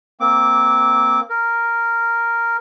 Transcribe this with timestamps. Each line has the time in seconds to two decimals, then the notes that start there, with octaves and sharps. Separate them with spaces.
0.20 A#3 C4 D6
1.30 A#4